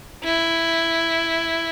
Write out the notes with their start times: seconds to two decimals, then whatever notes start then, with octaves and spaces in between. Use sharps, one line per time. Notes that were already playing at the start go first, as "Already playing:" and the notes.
0.24 E4